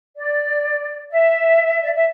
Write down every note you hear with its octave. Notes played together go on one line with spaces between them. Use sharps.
D5
E5
D5
E5